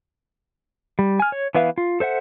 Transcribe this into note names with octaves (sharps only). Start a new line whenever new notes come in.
G3
G#5 F6
C#5
E3 B3 B4 E5 F5
F4
A4 C5 E5 F#5